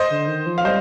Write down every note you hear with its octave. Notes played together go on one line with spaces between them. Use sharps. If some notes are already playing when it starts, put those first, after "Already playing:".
Already playing: C5 D#5
D3
D#3
F3
F5
G3 C5 D#5